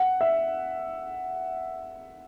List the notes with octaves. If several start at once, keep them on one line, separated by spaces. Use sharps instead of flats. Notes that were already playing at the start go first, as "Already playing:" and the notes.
Already playing: F#5
E5